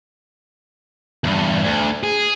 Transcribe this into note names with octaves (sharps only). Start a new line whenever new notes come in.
E2 G2
D2
G#4